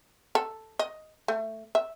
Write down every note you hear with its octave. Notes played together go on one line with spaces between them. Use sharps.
A4
D#5
A3
E5